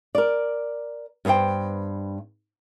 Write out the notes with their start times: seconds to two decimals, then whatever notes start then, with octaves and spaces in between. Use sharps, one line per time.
0.15 A#4 D5
1.25 G2 B3 G#4 C5 G5